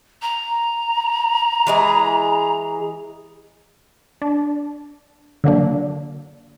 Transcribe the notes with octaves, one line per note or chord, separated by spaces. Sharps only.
A#5
E3 G#3 G#4
D4
D3 F#3 A#3 D4